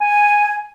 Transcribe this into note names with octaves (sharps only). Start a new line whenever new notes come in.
G#5